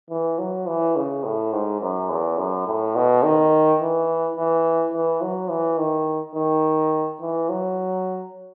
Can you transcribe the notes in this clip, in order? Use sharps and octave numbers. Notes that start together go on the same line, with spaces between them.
E3
F#3
E3
C#3
A2
G#2
F#2
E2
F#2
A2
B2
D#3
E3
E3
E3
F#3
E3
D#3
D#3
E3
F#3